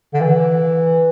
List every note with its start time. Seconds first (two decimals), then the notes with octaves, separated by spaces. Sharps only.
0.14 D3
0.21 E3